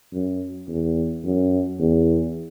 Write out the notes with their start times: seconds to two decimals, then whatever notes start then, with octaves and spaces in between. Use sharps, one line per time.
0.13 F#2
0.68 E2
1.24 F#2
1.80 E2